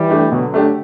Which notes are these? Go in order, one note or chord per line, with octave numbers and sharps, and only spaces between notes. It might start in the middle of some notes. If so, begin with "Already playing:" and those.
Already playing: E3 G3
A3 D4 G4
B2 D3 F#3
A3 D4 G4